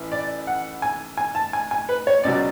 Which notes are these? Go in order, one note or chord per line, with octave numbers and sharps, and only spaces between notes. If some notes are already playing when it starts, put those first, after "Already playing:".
Already playing: A1 E3
D5
F#5
G#5
G#5
A5
G#5
G#5
B4
C#5
C#2 B2 F#3 D5